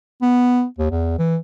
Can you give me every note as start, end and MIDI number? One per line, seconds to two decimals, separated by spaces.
0.22 0.65 59
0.79 0.89 39
0.91 1.13 40
1.18 1.37 52